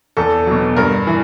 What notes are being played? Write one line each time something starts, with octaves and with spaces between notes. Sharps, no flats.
E2 A4
B2 F#3
G2 A#4
E3